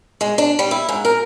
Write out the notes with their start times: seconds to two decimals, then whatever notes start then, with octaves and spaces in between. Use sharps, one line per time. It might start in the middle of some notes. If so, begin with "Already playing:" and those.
0.21 G#3
0.38 D4
0.59 G3
0.71 E4
0.89 G#2
1.05 A#4